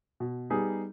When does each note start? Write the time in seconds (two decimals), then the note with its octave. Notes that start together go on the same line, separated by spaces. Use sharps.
0.20 B2
0.50 G3 B3 D#4 G#4